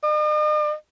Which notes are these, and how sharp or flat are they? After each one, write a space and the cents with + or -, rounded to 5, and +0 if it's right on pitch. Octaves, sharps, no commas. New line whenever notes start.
D#5 -45